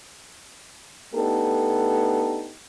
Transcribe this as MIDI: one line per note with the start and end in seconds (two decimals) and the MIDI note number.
1.14 2.52 57
1.14 2.52 59
1.14 2.52 62
1.14 2.52 63
1.14 2.52 67
1.14 2.52 69